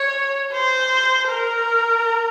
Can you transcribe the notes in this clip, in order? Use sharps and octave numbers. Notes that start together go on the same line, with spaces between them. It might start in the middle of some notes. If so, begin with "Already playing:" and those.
Already playing: C#5
C5
A#4